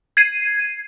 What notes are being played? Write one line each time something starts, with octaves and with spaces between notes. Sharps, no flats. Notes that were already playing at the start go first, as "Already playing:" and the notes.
G#6 C7 D#7